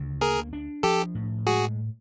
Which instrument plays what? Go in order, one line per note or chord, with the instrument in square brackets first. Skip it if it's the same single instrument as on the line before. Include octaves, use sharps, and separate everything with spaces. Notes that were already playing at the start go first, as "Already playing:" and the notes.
Already playing: [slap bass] D2 C#3
[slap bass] A#3 [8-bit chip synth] G#4 A#4
[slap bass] D4
[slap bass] F3 [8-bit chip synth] G4 A4
[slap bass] A2
[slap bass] G#3 [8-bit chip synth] F#4 G#4